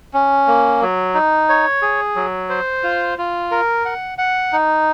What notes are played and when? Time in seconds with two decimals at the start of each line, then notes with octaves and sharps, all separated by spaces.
0.14 C#4
0.47 A#3
0.82 F#3
1.14 D#4
1.49 C#5
1.82 G#4
2.16 F#3
2.49 C5
2.83 F4
3.18 F4
3.51 A#4
3.85 F#5
4.18 F#5
4.53 D#4